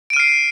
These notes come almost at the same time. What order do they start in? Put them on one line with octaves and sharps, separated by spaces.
D7 D#7 F6 C7